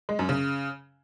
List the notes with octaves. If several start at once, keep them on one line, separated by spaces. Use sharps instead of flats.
G#3
F#2
C#3